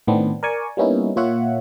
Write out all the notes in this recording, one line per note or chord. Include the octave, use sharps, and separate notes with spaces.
A2 D#3 B3 C4 D4
A#4 D5 G#5 C#6
G3 A#3 B3 C#4 D#4 E4
A#2 A#3 F4 C#5 E5 F#5